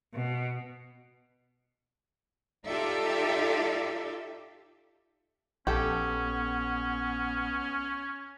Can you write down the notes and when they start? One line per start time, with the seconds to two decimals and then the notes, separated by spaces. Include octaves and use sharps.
0.14 B2
2.67 D#4 F4 G4 A4 D5 E5
5.67 A#1 B3 C#4 G4 A4